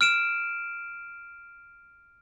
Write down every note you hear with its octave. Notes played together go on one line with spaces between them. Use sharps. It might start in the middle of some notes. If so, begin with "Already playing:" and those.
F6 D7 E7